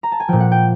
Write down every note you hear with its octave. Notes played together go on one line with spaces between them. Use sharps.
A#5
A5
G#5
A#2 F3 G5
F#5
G5